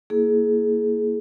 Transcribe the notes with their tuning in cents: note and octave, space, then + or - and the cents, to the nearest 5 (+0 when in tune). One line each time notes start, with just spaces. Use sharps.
A#3 +0 E4 +0 G#4 +25